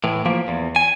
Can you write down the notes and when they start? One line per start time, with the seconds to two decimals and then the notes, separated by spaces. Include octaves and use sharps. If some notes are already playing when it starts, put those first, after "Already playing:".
0.04 A2 E3
0.26 F3 A#3
0.48 E2
0.76 G#5